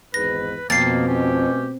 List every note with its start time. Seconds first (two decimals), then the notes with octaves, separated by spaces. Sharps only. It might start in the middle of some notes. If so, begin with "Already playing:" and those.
0.14 G#1 E2 G#2 B4 A#6
0.70 F2 B2 A#3 A6 C7
1.08 A3 C#4 G4